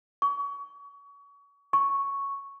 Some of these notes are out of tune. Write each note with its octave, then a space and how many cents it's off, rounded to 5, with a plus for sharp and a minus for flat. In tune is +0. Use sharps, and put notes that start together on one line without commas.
C#6 +30
C#6 +0